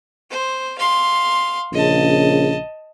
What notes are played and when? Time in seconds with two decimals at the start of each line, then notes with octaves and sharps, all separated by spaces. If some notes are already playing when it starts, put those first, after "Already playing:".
0.30 C5
0.78 F5 C6
1.73 A#1 C#3 D#5 A5